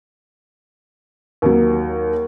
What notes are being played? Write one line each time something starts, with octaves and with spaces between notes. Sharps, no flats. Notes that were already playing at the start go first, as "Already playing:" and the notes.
D#2 F#3